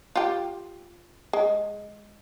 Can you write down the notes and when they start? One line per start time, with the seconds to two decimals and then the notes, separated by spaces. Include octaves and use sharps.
0.16 F4 G4
1.33 G#3